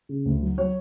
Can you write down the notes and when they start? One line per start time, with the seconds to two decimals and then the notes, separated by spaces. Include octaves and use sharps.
0.09 C#3
0.26 D2
0.42 F#3
0.58 F#3 C#5